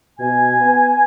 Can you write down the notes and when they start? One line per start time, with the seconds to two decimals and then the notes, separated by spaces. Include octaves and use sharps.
0.18 B2 G#5
0.58 B3